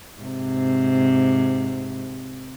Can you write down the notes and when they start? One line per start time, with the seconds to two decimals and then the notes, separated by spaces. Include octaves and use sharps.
0.20 G#2 C3